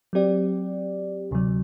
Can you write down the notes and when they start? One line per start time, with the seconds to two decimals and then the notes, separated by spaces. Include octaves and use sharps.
0.13 F#3 C4 G4 D5
1.31 D2 C3 F#3